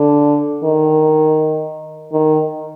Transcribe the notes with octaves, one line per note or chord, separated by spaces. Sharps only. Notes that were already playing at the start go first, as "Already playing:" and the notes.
Already playing: D3
D#3
D#3